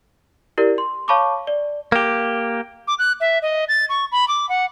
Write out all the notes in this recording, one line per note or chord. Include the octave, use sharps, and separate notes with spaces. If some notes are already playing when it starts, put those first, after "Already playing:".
E4 G4 A#4 D5
C6
C#5 F5 A5 B5 C#6 D6
D5
A#3 G4
D6
F#6
E5
D#5
A6
C#6
B5
D6
F#5